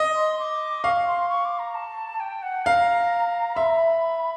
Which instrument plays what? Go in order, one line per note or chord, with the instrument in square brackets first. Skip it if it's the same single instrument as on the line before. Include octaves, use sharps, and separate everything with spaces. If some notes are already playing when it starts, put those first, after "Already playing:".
Already playing: [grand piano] D#5
[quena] C6
D6
[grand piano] F5 [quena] C#6
[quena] C6
C#6
D6
A#5
A5
G5
F#5
[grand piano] F5 [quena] A#5
[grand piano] E5 [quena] C6
[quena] B5
A#5
B5